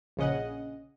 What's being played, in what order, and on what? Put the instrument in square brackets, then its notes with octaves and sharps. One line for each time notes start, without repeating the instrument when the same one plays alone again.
[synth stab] A#1 C#3 C#4 D#5 F#5